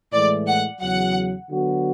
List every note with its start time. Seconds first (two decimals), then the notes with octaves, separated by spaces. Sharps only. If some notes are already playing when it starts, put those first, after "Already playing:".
0.12 A2 E3 G#3 D5
0.47 F#5
0.81 E2 C#3 F#3 F#5
1.50 D3 F#3 B3 F#4